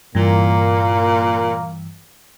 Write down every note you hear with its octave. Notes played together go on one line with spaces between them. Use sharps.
G2 A#2 E3 A#3